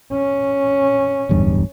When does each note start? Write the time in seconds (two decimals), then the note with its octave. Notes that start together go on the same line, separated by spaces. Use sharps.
0.12 C#4
1.29 D1 E2 G2